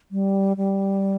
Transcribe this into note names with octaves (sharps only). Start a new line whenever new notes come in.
G3
G3